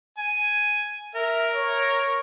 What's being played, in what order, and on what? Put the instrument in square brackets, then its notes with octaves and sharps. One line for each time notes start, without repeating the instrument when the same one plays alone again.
[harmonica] G#5
[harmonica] A#4 [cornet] E5
[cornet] C#5